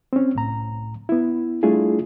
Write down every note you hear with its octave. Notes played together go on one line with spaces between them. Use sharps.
C4 C#4
C2 A2 A#5
B3 E4
G3 A3 D4 E4 F4 G#4